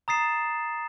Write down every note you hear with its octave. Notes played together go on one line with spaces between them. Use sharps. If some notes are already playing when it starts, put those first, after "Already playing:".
A#5 D#6 A6 C7 E7